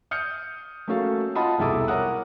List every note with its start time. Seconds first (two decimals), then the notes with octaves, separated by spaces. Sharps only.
0.11 D#6 F6 G6 C#7
0.88 A3 A#3 C#4 F#4 A4 F5
1.35 F4 D#5 F#5 A5 B5 D#6
1.58 E1 C2 E4 A4 D6 D#6
1.88 A#4 C#5 F#5 D#6 F#6